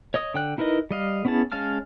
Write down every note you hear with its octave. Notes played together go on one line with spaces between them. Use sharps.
C#5 D#5 D#6
D3 G5 F#6
D#4 E4 A#4 B4 D#5
G3 D#5 F5
B3 C#4 E4 G#4 A5
G#3 C#4 F5 A5 F6